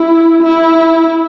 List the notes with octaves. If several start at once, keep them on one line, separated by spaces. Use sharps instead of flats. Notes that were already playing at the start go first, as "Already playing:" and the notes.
Already playing: E4
E4